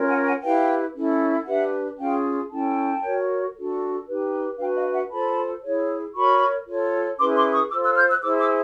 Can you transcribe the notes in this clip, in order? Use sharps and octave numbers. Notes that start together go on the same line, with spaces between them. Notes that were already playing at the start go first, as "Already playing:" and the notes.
Already playing: C#4 F4 A#4 C#5
F#5 G#5
F#5 G#5
E4 G4 B4 F5 G5
C#4 E4 A4
D4 G4 B4 E5 F#5
C#4 F4 G#4 F5 G5
C#4 E4 A4 G5 A5
F#4 A#4 C#5
D4 F#4 A4
D#4 G4 B4
D4 F#4 B4 F5 G5
D#5 F5
E5 F#5
F4 A4 C5 A5 B5
E4 G#4 C#5
F#4 A#4 C#5 B5 C#6
F4 A4 C#5
C#4 E4 G#4 B4 C6 D6
C6 D6
C#6 D#6
F4 A4 C5 D6 E6
E6 F#6
F6 G6
E6 F#6
E4 G#4 C5 D6 E6
D6 E6